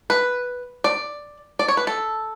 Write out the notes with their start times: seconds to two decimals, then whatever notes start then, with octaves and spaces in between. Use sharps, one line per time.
0.10 B4
0.84 D5
1.59 D5
1.68 C#5
1.77 B4
1.87 A4